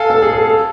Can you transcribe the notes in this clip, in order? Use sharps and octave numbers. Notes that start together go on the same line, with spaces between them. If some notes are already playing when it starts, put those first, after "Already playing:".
Already playing: A4 F5 G#5
A4
G#4
A4
A4